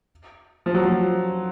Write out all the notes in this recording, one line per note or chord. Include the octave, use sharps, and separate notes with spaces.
F3
F#3
F3